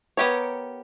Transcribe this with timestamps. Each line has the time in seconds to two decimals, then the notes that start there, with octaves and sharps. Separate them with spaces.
0.17 B3 G4 A#4 C#5